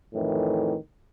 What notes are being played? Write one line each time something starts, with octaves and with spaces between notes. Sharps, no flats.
F2 A2 D#3 E3